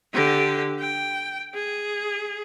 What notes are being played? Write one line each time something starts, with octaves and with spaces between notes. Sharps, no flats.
D3 G4
G5
G#4